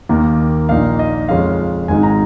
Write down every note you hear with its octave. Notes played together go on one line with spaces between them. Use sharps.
D#2 D#3 A#3
A#1 A#2 A#3 D#4 F5
D#5
F2 C#3 G#3 C#4 F4 F5
G#1 G#2 G#3 D#4 G#5
A#5